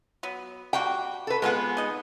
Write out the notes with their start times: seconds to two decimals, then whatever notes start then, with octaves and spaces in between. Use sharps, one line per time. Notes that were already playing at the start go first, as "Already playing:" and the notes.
0.23 F#3 B3
0.73 G3 A#3 F#4 G5
1.27 A4 B4
1.42 F3 G#3 B3 C4 B4
1.77 D#4 D#5